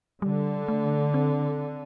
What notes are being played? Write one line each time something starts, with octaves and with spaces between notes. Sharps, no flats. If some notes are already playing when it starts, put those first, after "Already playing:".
D3 G3
A3
C4